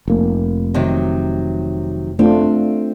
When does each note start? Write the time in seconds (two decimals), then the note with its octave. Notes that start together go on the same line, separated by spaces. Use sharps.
0.08 F1 A#3
0.74 C3 D#3 F#3
2.19 A3 C4 D4 F4